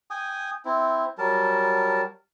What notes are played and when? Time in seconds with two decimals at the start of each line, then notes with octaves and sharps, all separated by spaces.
0.11 G5 G#5 D#6
0.65 C4 E4
1.18 F#3 G3 A#4 A5